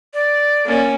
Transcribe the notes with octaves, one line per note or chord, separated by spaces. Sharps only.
D5
A#3 C#4